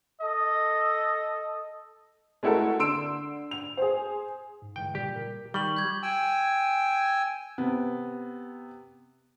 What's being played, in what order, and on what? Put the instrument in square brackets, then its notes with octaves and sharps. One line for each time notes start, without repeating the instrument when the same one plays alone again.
[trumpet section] A4 D#5
[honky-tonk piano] G#3 A3 E4 F#4 A4 A#4
D3 C6 E6 D7
F7
G#4 C5
[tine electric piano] G#2
[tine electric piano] D3 E3 G#3 [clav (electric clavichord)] G5
[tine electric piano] A#2 C#3 G3 [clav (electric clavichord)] G4
[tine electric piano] A#4
[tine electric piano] D#3 [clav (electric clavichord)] G3 [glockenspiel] C#6 F#7
[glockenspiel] G6 G#6
[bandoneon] G5 G#5 E6
[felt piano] C3 B3